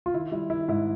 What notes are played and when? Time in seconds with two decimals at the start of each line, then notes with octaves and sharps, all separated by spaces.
0.06 F4
0.14 D#3 E4
0.31 G3 E4
0.50 D#3 E4
0.68 G#2 E4